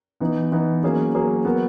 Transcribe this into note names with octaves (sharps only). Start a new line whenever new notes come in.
E3 B3 D#4
E3 B3 D#4
F#3 A#3 C#4 G#4
F#3 A#3 C#4 G#4
F#3 B3 F#4 A#4